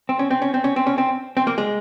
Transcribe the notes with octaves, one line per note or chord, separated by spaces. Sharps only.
C4
C#4
C4
C#4
C4
C#4
C4
C#4
C4
C4
A#3
G#3